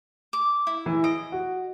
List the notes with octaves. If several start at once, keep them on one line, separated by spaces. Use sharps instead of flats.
D6
E4
E3
D#5 D7
F#4